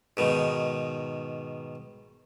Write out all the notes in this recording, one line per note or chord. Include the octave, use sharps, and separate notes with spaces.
G#2 B2 D#3